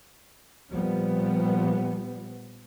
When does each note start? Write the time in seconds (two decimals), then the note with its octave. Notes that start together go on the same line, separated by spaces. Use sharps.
0.70 A#2 F3 G3 B3